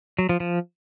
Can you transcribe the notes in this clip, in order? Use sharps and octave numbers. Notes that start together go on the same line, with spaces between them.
F#3
F3
F3